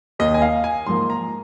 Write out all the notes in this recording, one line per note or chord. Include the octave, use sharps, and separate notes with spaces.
D#2 D#3 A#3 D#5
G#5
F5
G#5
G#2 F3 A#3 C6
A#5